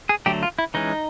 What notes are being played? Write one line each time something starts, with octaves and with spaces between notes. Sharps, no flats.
G#4
D3 F#3 A3 G4
F4
E4
E3 G#3 C#4 D#4